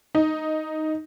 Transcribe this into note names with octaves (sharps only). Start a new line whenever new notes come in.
D#4